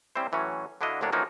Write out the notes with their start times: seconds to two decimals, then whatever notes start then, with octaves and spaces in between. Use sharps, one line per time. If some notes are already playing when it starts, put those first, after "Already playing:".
0.15 G3 C4 C#4 E4 C5
0.32 A2 E3 F#3 C#4
0.81 D3 D4 E4 F#4 D#5 F5
1.01 D2 A2 F#3 A#3 D4 C#5
1.12 E3 F3 A#3 C#4 D#4 F#4